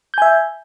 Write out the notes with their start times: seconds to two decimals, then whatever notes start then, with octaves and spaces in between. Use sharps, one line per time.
0.14 G6
0.18 G#5
0.22 E5